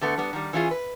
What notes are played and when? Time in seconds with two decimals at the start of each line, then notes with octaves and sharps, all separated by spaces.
0.01 D3 A3 B3
0.18 G3 B3
0.33 D#3 G3
0.53 E3 C#4 E4 F4 G#4
0.71 B4